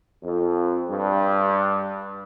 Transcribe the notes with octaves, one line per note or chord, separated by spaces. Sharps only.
F2
G2